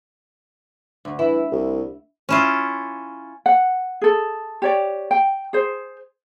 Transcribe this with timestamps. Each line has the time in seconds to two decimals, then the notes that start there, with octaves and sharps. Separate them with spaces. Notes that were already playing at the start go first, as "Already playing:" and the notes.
1.05 D2
1.19 E3 E4
1.52 C2
2.29 C#4 E4 F4
3.46 F#5
4.02 G#4 A4
4.62 G4 C#5 D5
5.11 G5
5.53 G#4 C5